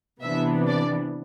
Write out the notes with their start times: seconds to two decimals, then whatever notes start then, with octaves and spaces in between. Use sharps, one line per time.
0.21 C3 E3 B3 D4 E5
0.67 D5